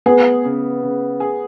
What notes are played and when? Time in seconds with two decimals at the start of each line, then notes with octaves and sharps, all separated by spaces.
0.06 B3 G#4
0.45 C#3
0.83 C#3
1.20 G#4